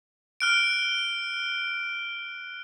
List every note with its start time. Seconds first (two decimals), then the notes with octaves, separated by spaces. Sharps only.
0.40 F6 F#6 D7